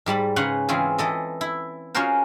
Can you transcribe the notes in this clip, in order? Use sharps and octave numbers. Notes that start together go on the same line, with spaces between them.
G#2 G3 A5 B5
C#3 C#4 B4 F#5 A#5 C6
E3 C4 C#4 F4 G#4
E3 A4 D#5
E4
C#4 F4 F#4 G#4 A#4 C5